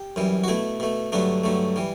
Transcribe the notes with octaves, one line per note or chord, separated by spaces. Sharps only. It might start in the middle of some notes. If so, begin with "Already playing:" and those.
Already playing: G4
F#2 E3 G3
F#4
B2 A3 E4
B2 A3
G2 D3 F#3 A3 D4
G2 D3 F#3 A3
E3 G3